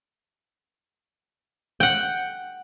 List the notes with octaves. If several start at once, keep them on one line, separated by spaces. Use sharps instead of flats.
F#5 G5